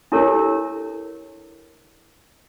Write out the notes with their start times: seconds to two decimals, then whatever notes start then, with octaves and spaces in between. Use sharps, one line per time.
0.12 D4 E4 G4 A4 A#4 C#5